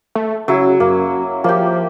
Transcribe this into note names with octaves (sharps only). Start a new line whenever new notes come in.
A3
C#3 F#3 E4
F#2 A#3
F3 A#3 G4